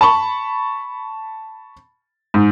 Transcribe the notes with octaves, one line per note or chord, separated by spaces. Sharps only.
A5 B5 C#6
G#2